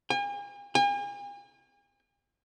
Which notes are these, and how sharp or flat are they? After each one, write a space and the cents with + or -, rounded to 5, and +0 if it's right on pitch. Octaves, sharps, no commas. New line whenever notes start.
G#5 -45
G#5 -45